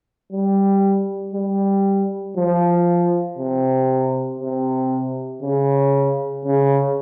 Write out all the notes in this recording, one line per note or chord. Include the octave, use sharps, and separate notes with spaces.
G3
G3
F3
C3
C3
C#3
C#3